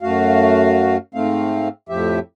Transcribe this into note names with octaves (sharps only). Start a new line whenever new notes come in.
F#2 A3 F#4 F5
G#2 A3 C4 F5
F2 A2 F3 G4 E5